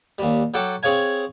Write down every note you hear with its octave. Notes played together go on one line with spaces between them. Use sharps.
D#2 G3
F#3 A4 F#5 G5 A5 D6
C4 G#4 C#5 F5 G#5